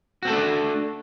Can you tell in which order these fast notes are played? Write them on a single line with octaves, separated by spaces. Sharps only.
F#4 C4 A4 A3 D4